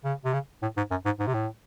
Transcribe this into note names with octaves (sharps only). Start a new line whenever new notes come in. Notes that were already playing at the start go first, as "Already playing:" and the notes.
C#3
C3
C#3
A2
G#2
F#2
G#2
G#2
C3
A2